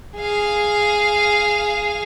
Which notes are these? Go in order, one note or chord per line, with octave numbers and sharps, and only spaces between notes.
G#4 F5